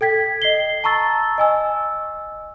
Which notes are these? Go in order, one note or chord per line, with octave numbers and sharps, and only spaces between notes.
A4 G5 G#6 B6
D#5 C7 G7
A5 A#5 C#6 E6 A6
D#5 G#5 E6